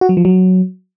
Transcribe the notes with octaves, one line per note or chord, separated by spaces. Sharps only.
F#4
F#3
F3
F#3